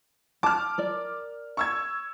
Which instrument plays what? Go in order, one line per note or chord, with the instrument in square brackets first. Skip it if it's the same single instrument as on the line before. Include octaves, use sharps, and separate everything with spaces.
[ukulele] A5 [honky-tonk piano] D6 F6
[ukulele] A#4 D5
[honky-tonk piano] C#6 E6 G#6